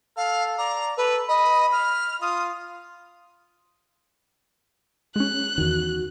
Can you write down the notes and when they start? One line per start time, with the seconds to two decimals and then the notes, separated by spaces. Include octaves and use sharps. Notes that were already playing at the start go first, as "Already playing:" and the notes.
0.17 A4 F5
0.58 D5 A#5
0.97 A4 B4
1.29 D#5 B5
1.72 F6
2.22 F4 D#6
5.16 G#3 C#4 F#6
5.58 E2 D#3 F#4